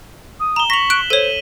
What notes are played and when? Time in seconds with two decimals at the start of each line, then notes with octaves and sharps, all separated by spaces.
0.40 D#6
0.56 A#5 E7 G7
0.70 C#6 A#6 B6 F7 F#7
0.90 F#6 D7
1.10 A4 C5 C#5 D#7